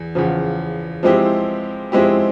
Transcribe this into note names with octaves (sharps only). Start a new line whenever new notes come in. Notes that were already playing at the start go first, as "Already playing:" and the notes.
Already playing: E2
E2 C#3 F3
F3 G#3 C4 E4 G4
F3 G#3 C4 E4 G4